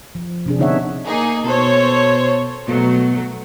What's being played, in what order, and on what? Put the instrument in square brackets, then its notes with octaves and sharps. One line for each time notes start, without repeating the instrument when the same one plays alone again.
[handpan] F3
C3 D4 G#4
D3 B3 D#4 C#5 E5 F#5
[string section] A#3 D#4 G#4
[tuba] B2 [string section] A4 C5 C#5
[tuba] B2 [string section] F#3 A3